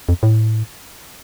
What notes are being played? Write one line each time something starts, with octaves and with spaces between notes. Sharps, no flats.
F2
A2